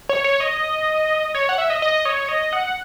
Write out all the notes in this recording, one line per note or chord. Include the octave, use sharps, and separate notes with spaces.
C#5
C#5
D#5
C#5
F#5
E5
D#5
D#5
C#5
D#5
F#5